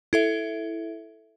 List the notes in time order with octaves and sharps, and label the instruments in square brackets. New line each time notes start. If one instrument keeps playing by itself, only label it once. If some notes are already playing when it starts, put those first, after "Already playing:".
[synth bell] E4 A4 E5